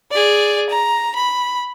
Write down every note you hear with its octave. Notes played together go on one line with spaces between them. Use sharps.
G#4 D5
A#5
B5